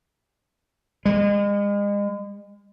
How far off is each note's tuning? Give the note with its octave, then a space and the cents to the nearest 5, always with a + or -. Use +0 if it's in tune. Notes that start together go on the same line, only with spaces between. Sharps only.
G#3 -35